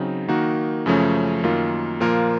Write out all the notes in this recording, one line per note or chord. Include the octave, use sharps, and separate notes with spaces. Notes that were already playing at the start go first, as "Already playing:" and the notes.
Already playing: C#3 F#3 C4 D#4
D#3 A#3 D#4 F#4
F#2 C#3 F3 A3 C#4
F#2 D#3 A#3 F4
A#2 F3 A#3 F4 A#4